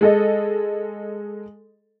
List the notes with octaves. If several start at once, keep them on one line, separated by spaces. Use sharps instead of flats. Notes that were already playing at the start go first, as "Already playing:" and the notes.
G#3 A4 D#5